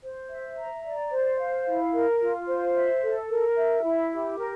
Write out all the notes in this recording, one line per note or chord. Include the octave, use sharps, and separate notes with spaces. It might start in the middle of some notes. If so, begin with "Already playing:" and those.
C5
E5
A#5
D5
C5
F5
E4
A#4
F4
C5
E5
A4
A#4
E5
E4
G4
A#4